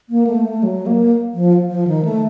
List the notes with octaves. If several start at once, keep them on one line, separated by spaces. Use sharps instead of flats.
A#3
A3
A3
F#3
A#3
F3
F3
D#3
A3